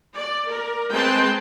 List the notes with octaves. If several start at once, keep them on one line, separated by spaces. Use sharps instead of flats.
D5
A#4
G#3 C4 B4 G5 A5 C6